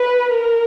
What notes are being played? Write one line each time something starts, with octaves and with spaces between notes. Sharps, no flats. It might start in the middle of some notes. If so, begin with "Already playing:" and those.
Already playing: B4
A#4